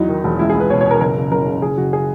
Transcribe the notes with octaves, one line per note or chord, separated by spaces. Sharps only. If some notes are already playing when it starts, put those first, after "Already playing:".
Already playing: E2 F#3 D#4
D#3
E1
C#2 E4
G#4
C#2 B4
B2 C#5
C#5
B2
A#4
F#1 A#4
C#3
F#1 A#4
C#3
F#1 G#4
F#1 F#4
G#4